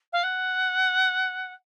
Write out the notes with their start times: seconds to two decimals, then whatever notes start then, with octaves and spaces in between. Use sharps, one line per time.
0.13 F5
0.23 F#5